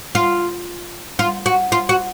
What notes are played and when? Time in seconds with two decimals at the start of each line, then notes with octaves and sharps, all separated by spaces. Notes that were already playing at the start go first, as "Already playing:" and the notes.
0.15 F4
1.19 F4
1.46 F#4
1.72 F4
1.89 F#4